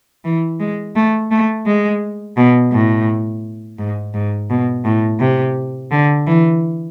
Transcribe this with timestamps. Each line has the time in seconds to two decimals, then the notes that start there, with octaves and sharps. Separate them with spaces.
0.25 E3
0.60 G#3
0.96 A3
1.31 A3
1.66 G#3
2.37 B2
2.73 A2
3.78 G#2
4.14 G#2
4.50 B2
4.85 A2
5.20 C3
5.91 D3
6.27 E3